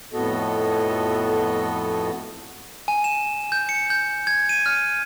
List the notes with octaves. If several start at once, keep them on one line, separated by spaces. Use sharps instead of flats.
F2 A2 B3 F#4 A4 D#5
G#5
E7
G6
C#7
G6
G#6
D#7
F6